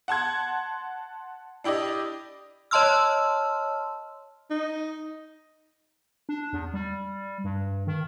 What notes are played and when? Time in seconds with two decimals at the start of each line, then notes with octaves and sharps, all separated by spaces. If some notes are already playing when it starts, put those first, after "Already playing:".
0.08 F#5 A5 C6 G#6
1.64 D4 E4 G4 D5 D#5
2.71 C#5 D#5 A5 C6 E6 F6
4.50 D#4
6.29 D4
6.53 E2
6.74 G3
7.44 G2
7.87 D#3